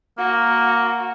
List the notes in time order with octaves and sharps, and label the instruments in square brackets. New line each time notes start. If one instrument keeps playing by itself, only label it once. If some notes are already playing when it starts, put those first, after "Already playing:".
[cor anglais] A#3 [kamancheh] F#4